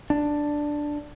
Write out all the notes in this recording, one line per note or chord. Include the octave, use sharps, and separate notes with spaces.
D4